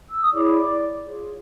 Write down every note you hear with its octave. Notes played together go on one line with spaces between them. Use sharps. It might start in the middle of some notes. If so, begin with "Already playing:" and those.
E6
D#6
E4 G#4 C#5 D5 D6
F4 G#4 C#5